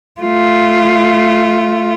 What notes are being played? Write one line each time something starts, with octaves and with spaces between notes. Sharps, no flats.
A3 F4